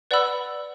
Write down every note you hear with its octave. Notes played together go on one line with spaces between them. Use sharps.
B4 D5 F#5 B5 E6